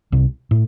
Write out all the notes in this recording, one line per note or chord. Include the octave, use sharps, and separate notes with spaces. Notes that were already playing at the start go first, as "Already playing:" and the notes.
C2 C3
A2